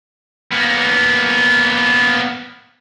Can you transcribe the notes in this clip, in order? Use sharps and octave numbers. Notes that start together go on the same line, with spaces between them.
A#3 B3